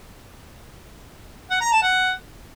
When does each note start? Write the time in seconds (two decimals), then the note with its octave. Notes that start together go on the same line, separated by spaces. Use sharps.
1.51 F#5
1.61 A#5
1.72 A5
1.82 F#5